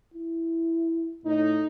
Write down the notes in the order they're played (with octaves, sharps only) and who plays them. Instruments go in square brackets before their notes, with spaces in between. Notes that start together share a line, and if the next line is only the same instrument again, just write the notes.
[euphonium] E4
[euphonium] A2 [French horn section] D#4